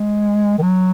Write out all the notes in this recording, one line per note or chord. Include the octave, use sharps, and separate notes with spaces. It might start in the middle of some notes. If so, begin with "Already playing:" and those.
Already playing: G#3
D#3
F#3